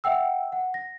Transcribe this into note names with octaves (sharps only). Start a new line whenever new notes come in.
E5 F#5 G5 E6
F#5
A#6